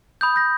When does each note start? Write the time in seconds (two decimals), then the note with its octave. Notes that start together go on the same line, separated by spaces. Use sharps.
0.21 B5 D#6 G6
0.36 G6 A#6